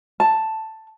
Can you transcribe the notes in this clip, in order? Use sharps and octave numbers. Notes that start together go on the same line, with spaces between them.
A5